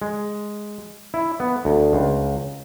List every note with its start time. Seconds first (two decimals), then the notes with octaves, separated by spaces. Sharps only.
0.02 G#3
1.14 E4
1.40 B3
1.65 D2
1.93 C#2